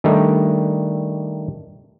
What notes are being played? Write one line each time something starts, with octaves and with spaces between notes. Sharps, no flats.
D#3 G3 A3 D4 D#4